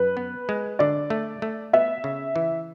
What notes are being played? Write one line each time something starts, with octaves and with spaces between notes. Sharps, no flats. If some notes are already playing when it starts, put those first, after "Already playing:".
Already playing: F#2 B4
B3
G#3
D3 D5
A3
A3
B3 E5
C#3
E3